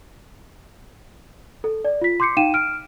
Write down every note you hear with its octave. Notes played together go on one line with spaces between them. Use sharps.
A4
D5
F4 B6
C6 D6 G6 C7 C#7
D#4 F5 G5 D#7 E7
F6 D7